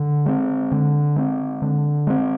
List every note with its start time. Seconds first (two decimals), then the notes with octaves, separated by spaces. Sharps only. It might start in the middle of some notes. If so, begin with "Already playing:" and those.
Already playing: D3
0.26 G#3 C4
0.71 D3
1.16 G#3 C4
1.62 D3
2.07 G#3 C4